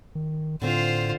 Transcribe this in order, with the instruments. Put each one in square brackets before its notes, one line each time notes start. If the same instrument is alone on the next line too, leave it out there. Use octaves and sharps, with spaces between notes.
[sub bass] D#3
[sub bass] A2 [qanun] D3 C4 [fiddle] F4 C5